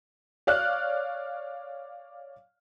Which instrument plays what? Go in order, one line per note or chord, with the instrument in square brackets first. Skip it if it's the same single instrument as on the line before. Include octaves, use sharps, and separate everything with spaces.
[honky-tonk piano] C#5 D5 F5 F6 F#6